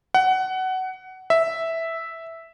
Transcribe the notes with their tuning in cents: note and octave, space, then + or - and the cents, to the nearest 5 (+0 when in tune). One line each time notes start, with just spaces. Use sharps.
F#5 +20
E5 -5